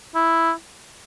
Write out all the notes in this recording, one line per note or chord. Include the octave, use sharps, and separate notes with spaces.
E4